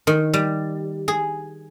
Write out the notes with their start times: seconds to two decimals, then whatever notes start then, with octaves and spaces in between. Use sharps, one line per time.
0.07 D#3
0.34 G3
1.08 G#4